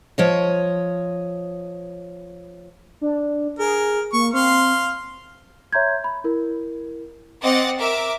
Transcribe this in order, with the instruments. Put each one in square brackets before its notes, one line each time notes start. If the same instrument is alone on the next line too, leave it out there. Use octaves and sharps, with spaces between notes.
[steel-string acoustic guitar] F3 C#5 D#5
[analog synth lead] D4
[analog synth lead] G#4 [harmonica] A#4
[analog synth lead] A#3 [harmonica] C#6
[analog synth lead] C4 [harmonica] F5 C6
[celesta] C#5 E5 A#5 C6 G6 G#6
B5
E4 A#4
[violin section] C4 D#5 F#5 D6 A6
A#4 E5 D6 D7